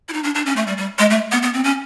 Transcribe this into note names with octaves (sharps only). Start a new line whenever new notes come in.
E4
D#4
D4
D4
C#4
A3
G3
G3
G#3
A3
B3
B3
C4
C#4